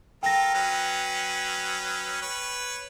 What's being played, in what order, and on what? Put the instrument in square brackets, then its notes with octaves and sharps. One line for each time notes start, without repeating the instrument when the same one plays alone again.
[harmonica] F4 A4 A#4 [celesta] G5 A#6
[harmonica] F#3 C#4 B4
B4 C#5